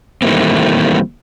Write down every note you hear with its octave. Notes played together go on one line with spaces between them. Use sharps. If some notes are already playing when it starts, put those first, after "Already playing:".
D#3 E3 G3 A3 A#3 C4